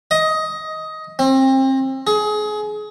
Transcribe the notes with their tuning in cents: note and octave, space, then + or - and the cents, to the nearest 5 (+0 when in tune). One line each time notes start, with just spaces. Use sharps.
D#5 +15
C4 +30
G#4 +25